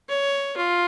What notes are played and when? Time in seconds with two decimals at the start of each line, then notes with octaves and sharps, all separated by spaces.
0.09 C#5
0.57 F4